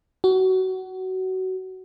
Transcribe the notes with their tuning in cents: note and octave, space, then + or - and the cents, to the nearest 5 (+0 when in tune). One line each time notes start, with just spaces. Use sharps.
F#4 +20